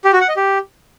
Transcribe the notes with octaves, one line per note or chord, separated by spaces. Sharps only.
G4
F#4
F#5
D#5
G4